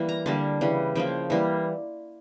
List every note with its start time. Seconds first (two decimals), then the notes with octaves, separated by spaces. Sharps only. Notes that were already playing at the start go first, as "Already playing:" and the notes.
Already playing: E3 G3 A#3
0.09 A#5
0.26 D3 G3 A#3 A5
0.61 C#3 E3 G3
0.95 C#3 F3 A#3 G5
1.30 E3 G3 A#3